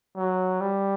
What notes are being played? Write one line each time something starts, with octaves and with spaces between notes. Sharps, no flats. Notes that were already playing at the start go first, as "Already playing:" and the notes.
F#3
G3